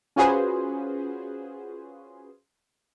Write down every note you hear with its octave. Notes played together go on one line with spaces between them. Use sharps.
C#4 F4 F#4 G#4 B4 C5